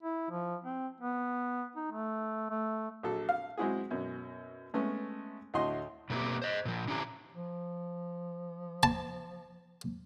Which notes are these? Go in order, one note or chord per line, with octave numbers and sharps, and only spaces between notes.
E4
F3
C4
B3
D#4
A3
A3
A#1 F#3 A4
F5
F#3 G#3 C4 E4 F#4 G#4
F#2 B2
G#3 A3 B3 C#4
D2 A2 F#4 D#5 C6
B2 A3 A#3 C4 G4
C5 D#5
A#2 F3
D3 C#4 D4 E4 G4 A#5
F3
A5